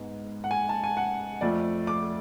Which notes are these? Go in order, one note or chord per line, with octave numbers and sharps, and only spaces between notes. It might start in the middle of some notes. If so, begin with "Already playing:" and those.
Already playing: G#2 G#3 B3
F#5
G#5
A5
G#5
F#5
F2 F3 A3 D5
D6